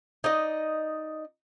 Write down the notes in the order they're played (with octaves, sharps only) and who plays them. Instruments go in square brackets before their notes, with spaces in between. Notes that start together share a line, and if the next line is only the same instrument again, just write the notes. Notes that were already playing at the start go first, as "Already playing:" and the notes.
[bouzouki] D#4 D5 D#5